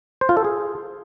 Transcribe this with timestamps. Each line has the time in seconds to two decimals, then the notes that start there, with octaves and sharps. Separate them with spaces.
0.21 C5
0.29 F4
0.37 A4
0.45 G#4